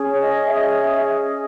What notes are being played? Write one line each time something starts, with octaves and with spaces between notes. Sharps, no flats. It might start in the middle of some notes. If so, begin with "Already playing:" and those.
Already playing: C#4 G#4
C#5
D#5
E5
D#5
E5
D#5